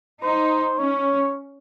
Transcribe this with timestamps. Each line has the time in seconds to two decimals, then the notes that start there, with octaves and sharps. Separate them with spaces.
0.23 D#4 C5
0.78 C#4 C#5